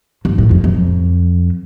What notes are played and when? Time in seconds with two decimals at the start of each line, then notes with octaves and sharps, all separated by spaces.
0.25 G2
0.38 A2
0.51 F2
0.64 F2